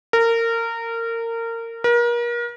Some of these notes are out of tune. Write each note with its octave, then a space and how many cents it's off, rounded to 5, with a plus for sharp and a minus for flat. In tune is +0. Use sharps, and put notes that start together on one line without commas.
A#4 -25
A#4 +35